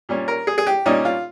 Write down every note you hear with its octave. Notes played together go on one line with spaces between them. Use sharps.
A#2 G3 C#4
A#4
G#4
G#4
G4
A#2 G3 C#4 D#4
F4